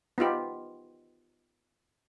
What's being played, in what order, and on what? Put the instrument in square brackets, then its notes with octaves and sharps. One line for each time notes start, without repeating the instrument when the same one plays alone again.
[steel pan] B3 D#4 F4 G4